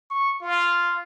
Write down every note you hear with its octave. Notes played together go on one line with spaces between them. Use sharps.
C#6
F4